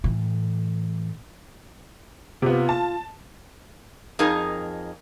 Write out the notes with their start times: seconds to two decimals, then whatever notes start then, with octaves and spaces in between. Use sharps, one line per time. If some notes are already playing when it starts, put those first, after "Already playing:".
0.04 A2 E3
2.42 C3 B3 F4
2.69 A5
4.19 F2 D#4 G#4 A#4 A5